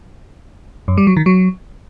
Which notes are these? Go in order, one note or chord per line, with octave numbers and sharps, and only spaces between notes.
F#2
G3
F#3
D#3
F#3